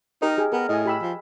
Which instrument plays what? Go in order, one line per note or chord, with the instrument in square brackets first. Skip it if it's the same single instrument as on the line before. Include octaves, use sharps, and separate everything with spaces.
[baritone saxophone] D#4 [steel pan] G4 A#4 D#5
[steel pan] G4 G#4
[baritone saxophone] B3 [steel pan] A#4
[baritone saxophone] A2 [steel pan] D#5 G#5
[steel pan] G4 B5 E6
[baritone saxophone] F3